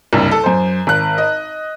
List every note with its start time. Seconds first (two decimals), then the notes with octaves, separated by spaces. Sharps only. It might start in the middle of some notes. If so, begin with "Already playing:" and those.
0.13 F#1 C2 G2
0.31 A4
0.43 F#2 C5
0.87 G#1 F#6
1.18 D#5